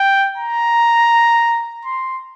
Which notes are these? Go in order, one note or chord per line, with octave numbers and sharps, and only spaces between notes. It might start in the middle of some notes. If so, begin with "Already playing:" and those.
Already playing: G5
A#5
C6